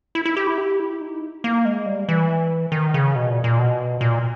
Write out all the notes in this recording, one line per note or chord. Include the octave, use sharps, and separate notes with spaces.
E4
E4
G4
E4
G4
E4
D#4
A#3
G#3
G3
E3
D#3
C#3
B2
A#2
A#2
B2
A#2